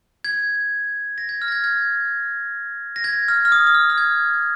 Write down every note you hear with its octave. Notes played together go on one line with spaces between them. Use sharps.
G#6
A#6
G#6
F6
A#6
G#6
G#6
A#6
G#6
F6
F6
D#6
D#6
F6
F6
G#6